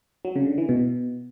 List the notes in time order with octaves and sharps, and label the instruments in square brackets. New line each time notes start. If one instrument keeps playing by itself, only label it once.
[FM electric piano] F#3
C#3
D3
E3
B2